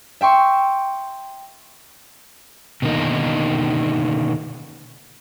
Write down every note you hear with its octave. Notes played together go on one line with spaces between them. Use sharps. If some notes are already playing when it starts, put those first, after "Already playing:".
E5 G5 C6 C#6
B2 D3 D#3 A#3 D#4